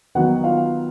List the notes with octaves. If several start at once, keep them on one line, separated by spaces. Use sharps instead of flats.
D#3 F#3 B3 F#4 F#5
F4 F5